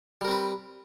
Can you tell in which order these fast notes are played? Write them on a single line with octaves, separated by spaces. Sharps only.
G3 A#4 C4 B4